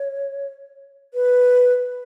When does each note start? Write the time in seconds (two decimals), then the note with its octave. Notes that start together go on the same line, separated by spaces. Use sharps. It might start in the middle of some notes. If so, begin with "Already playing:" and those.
Already playing: C#5
1.14 B4